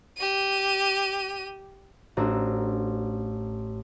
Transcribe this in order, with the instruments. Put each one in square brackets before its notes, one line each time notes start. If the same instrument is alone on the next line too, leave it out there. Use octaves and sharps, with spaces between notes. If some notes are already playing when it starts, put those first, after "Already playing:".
[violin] G4 D#7
[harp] A1 D4 F#4 C5 A#5 E6